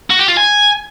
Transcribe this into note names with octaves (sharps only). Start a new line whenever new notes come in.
F#4
G4
F4
G#5